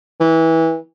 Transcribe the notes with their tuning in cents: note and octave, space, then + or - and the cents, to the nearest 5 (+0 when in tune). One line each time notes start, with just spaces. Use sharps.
E3 -20